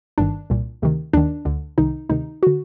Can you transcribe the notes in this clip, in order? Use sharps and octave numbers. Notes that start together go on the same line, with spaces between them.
G1 G2 D#3 D4
C2 A#2
D2 C3 D#3
D#2 D#3 D4
D2 D3
C2 C3 D#3 D#4
D2 C3 D#3 D#4
D3 F#4